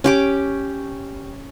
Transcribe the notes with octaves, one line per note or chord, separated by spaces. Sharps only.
C#4 G4 D6